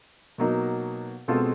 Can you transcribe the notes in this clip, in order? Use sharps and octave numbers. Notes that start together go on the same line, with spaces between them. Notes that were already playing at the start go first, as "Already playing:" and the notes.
B2 F#3 A#3 D#4
B2 G#3 C4 F4 A4